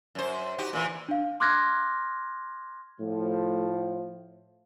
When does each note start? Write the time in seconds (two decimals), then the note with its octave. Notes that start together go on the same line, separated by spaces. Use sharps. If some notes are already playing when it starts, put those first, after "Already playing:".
0.15 F#2 C5
0.58 D#4 F#4 G4
0.73 A#2 E3
1.08 D4 F5
1.40 C6 D6 F6 F#6 G#6 A#6
2.99 A2 F3